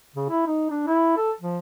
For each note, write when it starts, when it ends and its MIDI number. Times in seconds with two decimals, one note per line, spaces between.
0.15 0.28 49
0.30 0.45 64
0.47 0.68 63
0.70 0.83 62
0.87 1.14 64
1.17 1.32 69
1.41 1.59 53